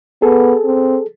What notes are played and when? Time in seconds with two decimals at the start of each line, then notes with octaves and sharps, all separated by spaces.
0.22 B3 G#4 A4
0.64 C4